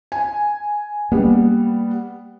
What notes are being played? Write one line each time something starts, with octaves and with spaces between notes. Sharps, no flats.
G#5
G3 A#3 B3